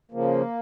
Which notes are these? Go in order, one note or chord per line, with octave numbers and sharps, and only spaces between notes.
C#3 F3 A#3